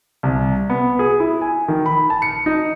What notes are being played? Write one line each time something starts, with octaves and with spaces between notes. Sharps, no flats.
C2
B3
G#4
E4
G#5
D#3
B5
A5
C#7
D#4